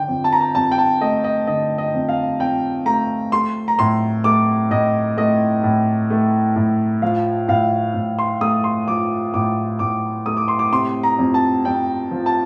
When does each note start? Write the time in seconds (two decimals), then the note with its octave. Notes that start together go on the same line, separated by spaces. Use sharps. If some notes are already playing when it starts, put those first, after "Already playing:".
Already playing: D3 G5
0.08 F2
0.24 A5
0.33 A#5
0.41 A5
0.55 F2 A5
0.71 G5
0.78 A5
1.01 A3 D#5
1.24 D#5
1.47 D3 D#5
1.78 D#5
1.94 F2
2.09 F5
2.40 F2 G5
2.86 A3 A#5
3.32 A3 C6
3.68 A#5
3.79 A2 C6
4.24 A3 D6
4.70 A2 D#5
5.17 A3 D#5
5.63 A2
6.10 A3
6.56 A2
7.02 F3 F5
7.48 A2 F5
7.94 A2
8.19 C6
8.41 A3 D#6
8.64 C6
8.88 F3 D6
9.34 A2 D6
9.79 A2 D6
10.26 A3 D#6
10.37 D6
10.48 C6
10.59 D6
10.72 C3 C6
11.03 A#5
11.19 F2
11.34 A5
11.65 F2 G5
12.11 F3
12.26 A5